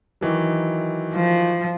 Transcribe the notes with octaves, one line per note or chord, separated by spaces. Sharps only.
D#3 E3 F#3
F3